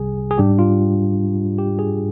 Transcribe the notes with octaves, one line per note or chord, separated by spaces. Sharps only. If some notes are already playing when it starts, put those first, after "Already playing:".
Already playing: C2 C3 G3 G#4
G#4
G#2 G3 D4 G4
F4
G4
G#4